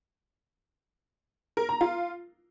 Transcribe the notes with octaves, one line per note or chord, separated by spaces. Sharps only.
A#4
A#5
F4